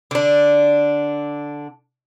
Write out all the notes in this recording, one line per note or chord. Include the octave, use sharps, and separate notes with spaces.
D3 D4